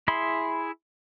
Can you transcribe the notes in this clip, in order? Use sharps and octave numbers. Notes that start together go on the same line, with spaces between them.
E4 G#4 B5 C6